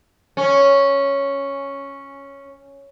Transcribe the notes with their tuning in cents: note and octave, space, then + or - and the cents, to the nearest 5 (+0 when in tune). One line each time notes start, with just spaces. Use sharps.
C#4 +0